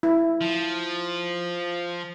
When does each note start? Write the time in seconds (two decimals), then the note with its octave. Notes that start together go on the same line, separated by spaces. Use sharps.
0.03 E4
0.42 F3